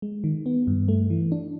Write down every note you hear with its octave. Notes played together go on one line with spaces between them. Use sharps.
G#3
D#3
B3
G2
A3
E3
D4